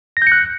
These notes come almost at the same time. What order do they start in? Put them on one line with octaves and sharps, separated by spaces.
A#6 G6 C#7 F#6